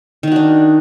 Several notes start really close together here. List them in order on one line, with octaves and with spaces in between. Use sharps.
D#3 D#4 F#4 D4